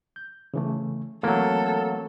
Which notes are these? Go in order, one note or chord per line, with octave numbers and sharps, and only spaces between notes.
G6
C#3 E3 A3
E3 F#3 A3 A#3 C4 A4